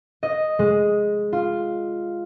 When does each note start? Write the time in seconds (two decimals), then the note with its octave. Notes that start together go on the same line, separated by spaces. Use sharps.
0.23 D#5
0.59 G#3
1.33 F4